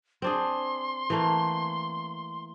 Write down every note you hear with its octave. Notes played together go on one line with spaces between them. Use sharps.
C4 D4 G#4 C6
E3 A3 A#3